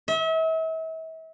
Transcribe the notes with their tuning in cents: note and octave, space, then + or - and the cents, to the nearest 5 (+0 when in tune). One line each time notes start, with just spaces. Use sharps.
E5 -40